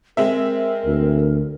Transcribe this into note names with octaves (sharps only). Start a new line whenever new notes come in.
G#3 C4 A#4 E5
D2